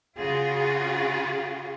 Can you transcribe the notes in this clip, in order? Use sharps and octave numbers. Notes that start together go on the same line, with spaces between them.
C#3 F4 F#4 G#4